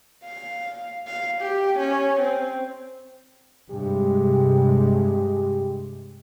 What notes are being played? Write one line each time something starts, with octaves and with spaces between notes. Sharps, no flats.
F5
F5
G4
C#4
C4
G2 C3 G#3 G4